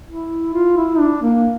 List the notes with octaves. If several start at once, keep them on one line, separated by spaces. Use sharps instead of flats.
E4
F4
E4
D4
A#3